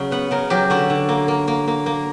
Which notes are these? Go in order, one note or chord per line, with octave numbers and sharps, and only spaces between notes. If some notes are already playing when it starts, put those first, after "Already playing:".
Already playing: C#3 F#3
B3 F#5
C#3 A#4
F#3 G4
D3 F#4
D3
A#3
A#3
A#3
A#3
A#3